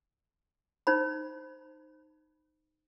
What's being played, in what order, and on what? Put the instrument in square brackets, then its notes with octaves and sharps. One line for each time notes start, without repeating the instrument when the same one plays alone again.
[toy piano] D#4 C5 B5